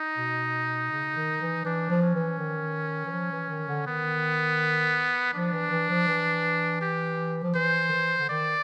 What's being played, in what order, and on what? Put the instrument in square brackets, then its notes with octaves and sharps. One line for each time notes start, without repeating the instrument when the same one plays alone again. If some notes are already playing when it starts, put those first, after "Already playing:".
Already playing: [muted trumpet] D#4
[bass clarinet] B2
C#3
D#3
E3
[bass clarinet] E3 [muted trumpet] D4
[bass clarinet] F3
[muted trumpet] C#4
[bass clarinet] E3
D#3
E3
F3
E3
D#3
D3
[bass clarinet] D#3 [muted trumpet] B3
[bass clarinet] F3 [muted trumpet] D4
[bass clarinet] E3
E3
F3
E3
[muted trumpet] G4
[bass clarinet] F3
[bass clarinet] E3 [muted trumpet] C5
[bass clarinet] D#3
E3
D3
[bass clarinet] D#3 [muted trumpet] D5